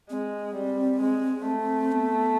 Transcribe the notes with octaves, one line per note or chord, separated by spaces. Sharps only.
G#3 C4
G3
G#3
A3
B3